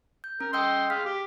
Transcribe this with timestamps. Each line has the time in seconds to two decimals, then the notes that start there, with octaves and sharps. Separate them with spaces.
0.24 G6
0.41 C#4 A#4
0.53 D#5 G5 C6 E6 G6
0.90 G#3 F5 B6
1.05 G4